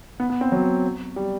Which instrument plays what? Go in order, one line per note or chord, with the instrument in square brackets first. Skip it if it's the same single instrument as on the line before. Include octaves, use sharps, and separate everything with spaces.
[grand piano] B3
B3
C4
F#3
G3